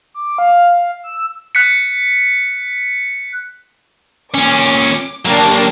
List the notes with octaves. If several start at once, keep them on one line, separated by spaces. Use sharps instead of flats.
D6
F5
E6
F#6 B6 C#7
A#2 C#4 D6
F#3 A#3 D4 G4 A#4